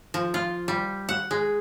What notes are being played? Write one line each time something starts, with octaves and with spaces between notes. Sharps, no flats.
F3
F4
G3
F#5
G#3